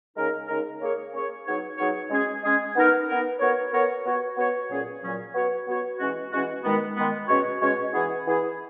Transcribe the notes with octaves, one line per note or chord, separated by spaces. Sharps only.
C#3 G#3 D#4 A#4
C#3 G#3 D#4 A#4
A#3 C#4 G#4 C#5
A#3 C#4 G#4 C#5
F#3 B3 D#4 G#4 C#5
F#3 B3 D#4 G#4 C#5
G#3 C#4 G#4
G#3 C#4 G#4
B3 D#4 A#4
B3 D#4 A#4
B3 F#4 A#4 C#5
B3 F#4 A#4 C#5
B3 F#4 C#5
B3 F#4 C#5
A#2 F#3 C#4 G#4
A#2 F#3 C#4 G#4
B3 F#4 C#5
B3 F#4 C#5
E3 G#3 C#4 F#4
E3 G#3 C#4 F#4
D#3 G#3 B3
D#3 G#3 B3
B2 G#3 C#4 F#4 C#5
B2 G#3 C#4 F#4 C#5
E3 B3 E4 G#4
E3 B3 E4 G#4